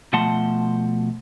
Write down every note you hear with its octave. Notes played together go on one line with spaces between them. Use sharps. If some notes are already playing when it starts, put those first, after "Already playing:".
B2 F3 A3 F#5 A5 C6